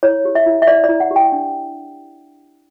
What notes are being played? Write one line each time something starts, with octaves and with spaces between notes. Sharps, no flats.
E4 C#5
G4
E5
E4
E5
B4 D5
D5
E4
F#5
G4
G5
D4